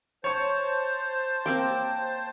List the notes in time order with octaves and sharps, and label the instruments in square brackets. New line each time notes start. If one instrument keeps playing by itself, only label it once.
[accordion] C5 A5 [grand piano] C#5 C#6
[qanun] A#3 C4 D6